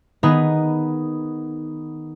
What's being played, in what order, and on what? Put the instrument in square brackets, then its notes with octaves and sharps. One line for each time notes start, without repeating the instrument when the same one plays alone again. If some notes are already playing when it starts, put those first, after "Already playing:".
[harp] D#3 B3 D#4 G#4 B4